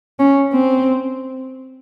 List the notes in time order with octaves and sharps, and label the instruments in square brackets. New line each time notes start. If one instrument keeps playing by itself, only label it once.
[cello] C#4
C4